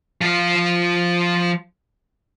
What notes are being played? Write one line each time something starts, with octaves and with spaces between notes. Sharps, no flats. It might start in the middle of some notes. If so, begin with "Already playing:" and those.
F3 F5